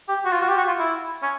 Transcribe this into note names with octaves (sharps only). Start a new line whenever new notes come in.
G4
F#4
F4
F#4
G4
F#4
F4
E4
C#4